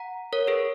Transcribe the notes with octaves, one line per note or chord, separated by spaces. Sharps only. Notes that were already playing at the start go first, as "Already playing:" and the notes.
Already playing: F#5 A#5
A#4 C#5
G#4 B4